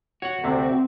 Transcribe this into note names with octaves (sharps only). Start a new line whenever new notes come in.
F#4 C#5 F#5
D2 C3 C4